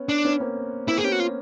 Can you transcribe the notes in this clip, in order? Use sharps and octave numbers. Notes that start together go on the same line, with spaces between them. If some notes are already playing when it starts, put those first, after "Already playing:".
Already playing: B3 C#4
D4
B3 C#4
A#3 C4
A#3 C4 E4
G#4
B3 C#4 G4
F#4
F4